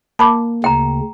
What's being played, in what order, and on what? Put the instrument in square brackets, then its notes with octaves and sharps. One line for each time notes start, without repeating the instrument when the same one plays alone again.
[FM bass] A#3 [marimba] A5 B5 D6
[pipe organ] D2 C#3 [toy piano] G5 A#5